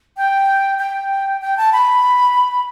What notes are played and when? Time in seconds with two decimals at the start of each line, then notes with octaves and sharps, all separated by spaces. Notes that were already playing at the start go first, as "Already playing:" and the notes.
0.17 G5
0.78 G5
1.41 G5
1.57 A5
1.73 B5